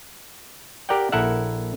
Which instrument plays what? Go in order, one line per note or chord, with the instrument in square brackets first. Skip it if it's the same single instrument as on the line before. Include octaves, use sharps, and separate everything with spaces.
[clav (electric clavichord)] G4 A#4 D5 F#5 G5
A#1 E4 A4 A#4 E5 F#5